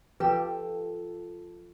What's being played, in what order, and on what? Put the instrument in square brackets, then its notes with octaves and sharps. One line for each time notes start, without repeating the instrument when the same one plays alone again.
[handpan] F3 F4 [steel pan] G4 [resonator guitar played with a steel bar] A4 G5 [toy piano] B4